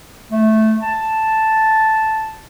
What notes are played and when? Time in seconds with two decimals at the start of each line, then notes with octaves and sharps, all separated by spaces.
0.32 A3
0.82 A5